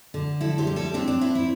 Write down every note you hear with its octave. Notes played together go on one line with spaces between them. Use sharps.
D3
A2 E4 A4
G4 C5
G3
E4 A4
C4 D4 G4
D4
C4 E4
E4